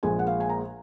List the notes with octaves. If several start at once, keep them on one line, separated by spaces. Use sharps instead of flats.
A#1 A#2 G#3 G#5
F#5
F5
G#5
A#5